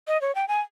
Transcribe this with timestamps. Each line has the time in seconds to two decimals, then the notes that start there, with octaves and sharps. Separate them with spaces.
0.08 D#5
0.21 C#5
0.35 G5
0.48 G#5